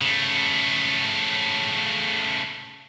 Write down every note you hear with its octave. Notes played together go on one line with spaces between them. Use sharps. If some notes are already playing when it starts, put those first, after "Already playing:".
C#3 A3